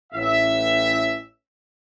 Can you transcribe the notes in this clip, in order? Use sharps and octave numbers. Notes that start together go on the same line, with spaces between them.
A1 E5